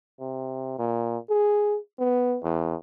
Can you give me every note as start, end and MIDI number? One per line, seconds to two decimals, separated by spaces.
0.20 0.78 48
0.79 1.18 46
1.30 1.78 68
1.99 2.38 59
2.43 2.75 40